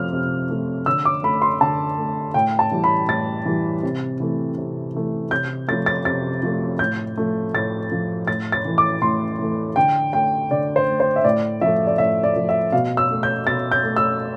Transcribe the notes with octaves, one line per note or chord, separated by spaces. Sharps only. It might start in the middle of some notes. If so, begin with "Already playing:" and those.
Already playing: C3 F3 A3 F6
C3
F3 A3
D3 E6
D6
A3 B5
C6
D3 A5
A3
A2 G5
A5
E3 G3
B5
A2 A6
E3 G3
C3
E3 A3
C3
E3 A3
C3 G6
F3 A3 A6
A6
C3 A6
F3 A3
A2 G6
F3 A3
A2 A6
F3 A3
A2 A6
A6
E3 A3
D6
A2 C6
E3 A3
D3 G5
A3 G5
D3 D5
C5
A3
C5
E5
A2 D5
F3 A3 E5
D5
A2 E5
D5
F3 A3
E5
B2 F5
E6
A3
G6
B2 A6
G6
A3
E6